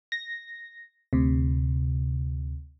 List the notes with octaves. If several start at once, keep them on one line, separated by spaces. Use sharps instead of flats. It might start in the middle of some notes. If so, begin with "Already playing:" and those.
A#6
D2 C3